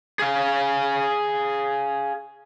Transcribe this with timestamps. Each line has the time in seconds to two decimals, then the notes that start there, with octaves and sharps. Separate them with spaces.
0.19 G#4 F5